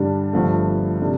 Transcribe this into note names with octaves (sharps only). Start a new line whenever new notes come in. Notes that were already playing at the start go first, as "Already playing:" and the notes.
Already playing: G2 D3 G3 D4
G1 G2 F3 A3
C3 G3 D4 A4